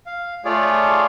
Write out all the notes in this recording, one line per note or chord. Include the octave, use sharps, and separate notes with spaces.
F5
A3 F4 G#4 C#5 D5